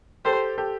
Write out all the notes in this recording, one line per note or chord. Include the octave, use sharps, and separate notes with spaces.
G4 A4 C5
G4 A4